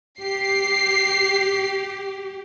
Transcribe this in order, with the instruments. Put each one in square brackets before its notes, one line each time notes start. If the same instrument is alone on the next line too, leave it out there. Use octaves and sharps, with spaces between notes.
[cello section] G4 [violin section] C7